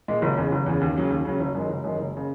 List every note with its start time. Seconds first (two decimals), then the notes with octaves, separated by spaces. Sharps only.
0.08 A#2 G#3
0.22 F#1
0.37 E2 C#3
0.52 F#1
0.66 E2 C#3
0.81 D#2
0.96 C#3 F#3 C#4
1.10 D#2
1.25 C#3 F#3 C#4
1.40 F#1
1.55 F#2 D#3 G#3
1.69 F#1
1.84 F#2 D#3 G#3
1.99 F#1
2.17 C#3